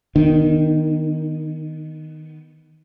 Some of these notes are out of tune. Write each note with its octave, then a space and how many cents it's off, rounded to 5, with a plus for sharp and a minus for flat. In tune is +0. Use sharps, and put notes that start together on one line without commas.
D#3 +0 B3 +0 D4 +25